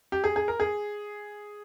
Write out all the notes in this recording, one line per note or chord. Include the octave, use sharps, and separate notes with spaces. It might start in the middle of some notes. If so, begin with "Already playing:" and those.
G4
G#4
G#4
A#4
G#4